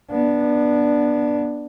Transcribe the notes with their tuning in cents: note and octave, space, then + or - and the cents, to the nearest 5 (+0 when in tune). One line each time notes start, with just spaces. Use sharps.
B3 -20 D4 +0